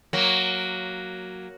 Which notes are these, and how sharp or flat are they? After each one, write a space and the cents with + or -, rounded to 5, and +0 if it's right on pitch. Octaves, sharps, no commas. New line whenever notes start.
F#3 +0 A#3 +0